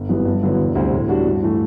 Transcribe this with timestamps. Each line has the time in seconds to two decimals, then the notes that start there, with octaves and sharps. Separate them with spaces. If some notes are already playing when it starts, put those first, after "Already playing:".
Already playing: G1
0.09 F#2 E3 G3 B3
0.25 G2
0.43 D3 F#3 B3 E4
0.59 E1
0.75 D2 C3 G3 C4
0.92 A2
1.08 G3 D4 F#4
1.26 G2
1.42 E3 A3